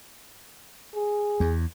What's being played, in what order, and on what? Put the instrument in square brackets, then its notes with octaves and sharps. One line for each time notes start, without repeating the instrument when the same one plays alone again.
[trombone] G#4
[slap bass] E2